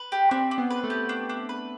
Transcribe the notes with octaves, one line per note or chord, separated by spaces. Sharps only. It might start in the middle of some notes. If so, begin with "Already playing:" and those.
Already playing: B4
G4
C4 D4
D4
B3
B4
A3
G4
D4
D4
B4